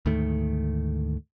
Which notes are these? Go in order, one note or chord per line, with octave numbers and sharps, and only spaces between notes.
D2 G#2 D#3 A3